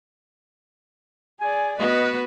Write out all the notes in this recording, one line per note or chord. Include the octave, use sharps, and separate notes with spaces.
G#4 D5 G#5
B3 F#4 B4 D#5